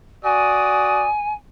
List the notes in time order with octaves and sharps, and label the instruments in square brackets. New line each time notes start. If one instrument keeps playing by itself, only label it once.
[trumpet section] F#4 D5 D#6 [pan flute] G#5